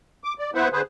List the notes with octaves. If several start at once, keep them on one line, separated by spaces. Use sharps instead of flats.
D6
D5
B3 E4 B4 C5 E5 F#5
D3 G#4 B4 C5